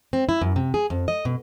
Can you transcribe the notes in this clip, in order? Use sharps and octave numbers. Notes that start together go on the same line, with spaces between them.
C4
E4
F#2
C3
G#4
F2
D#5
B2